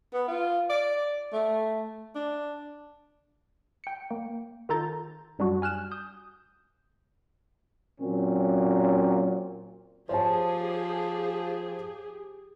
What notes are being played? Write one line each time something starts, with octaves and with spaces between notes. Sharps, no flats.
B3
F4
D5
A3
D4
G5 C#7
A#3
D#3 F4 A4 A#5 G6 A6
F#2 G3 D4 F#4
G#5 F6 F#6 E7
D#6 G6
A#2 F#3 C4 C#4
F3 G4 G#4 C5 C#5 A5